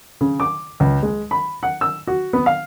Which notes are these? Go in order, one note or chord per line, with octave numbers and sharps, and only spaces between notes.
C#3
D6
C#2
G#3
B5
F#5
E6
F#4
B3
F5